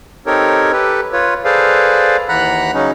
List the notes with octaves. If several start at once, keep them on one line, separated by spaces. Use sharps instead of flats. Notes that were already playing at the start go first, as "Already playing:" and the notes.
C4 D#4 G4 A4 A#4 C#5
G4 A4 B4
F4 B4 C#5
G#4 A4 B4 C5 D5 F5
D#2 E3 F#5 A#5 B5 F#6
C#3 F#3 C#4 D#4